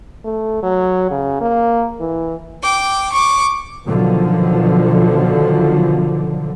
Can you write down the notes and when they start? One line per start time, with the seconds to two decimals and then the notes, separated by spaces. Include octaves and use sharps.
0.24 A3
0.63 F#3
1.11 C#3
1.41 A#3
2.00 E3
2.63 G5 D6
3.13 C#6 D6
3.87 B2 D3 D#3 F3 F#3